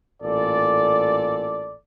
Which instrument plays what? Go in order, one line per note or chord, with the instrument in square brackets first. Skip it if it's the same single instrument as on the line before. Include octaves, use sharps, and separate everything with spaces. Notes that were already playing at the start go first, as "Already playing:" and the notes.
[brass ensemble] A1 A#2 A4 D5